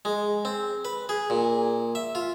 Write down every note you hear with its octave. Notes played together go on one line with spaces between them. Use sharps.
G#3
C4
B4
G#4
A#2
E5
F4